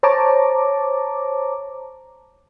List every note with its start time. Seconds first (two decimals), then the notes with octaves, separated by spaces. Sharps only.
0.03 C5 C#5 A5 A#5 D6